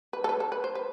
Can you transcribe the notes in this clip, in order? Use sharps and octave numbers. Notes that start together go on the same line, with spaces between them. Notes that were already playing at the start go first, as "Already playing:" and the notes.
B4
A4
B4
A4
B4
C5
B4